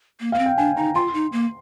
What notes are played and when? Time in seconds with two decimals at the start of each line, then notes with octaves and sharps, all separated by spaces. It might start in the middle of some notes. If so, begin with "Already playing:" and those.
0.20 A#3
0.32 A#3 F5
0.39 C4
0.46 G5
0.58 D4 G#5
0.77 D#4 A#5
0.95 F4 C6
1.14 D#4
1.32 A#3